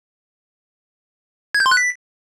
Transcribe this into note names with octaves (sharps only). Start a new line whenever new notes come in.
G#6
G6
C6
F#6
B6